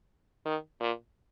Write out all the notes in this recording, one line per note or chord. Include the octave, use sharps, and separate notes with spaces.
D#3
A#2